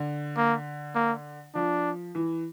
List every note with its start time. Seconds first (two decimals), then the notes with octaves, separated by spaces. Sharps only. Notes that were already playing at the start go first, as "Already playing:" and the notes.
Already playing: D3
0.37 A#3
0.95 A#3
1.55 F3 D4
2.15 E3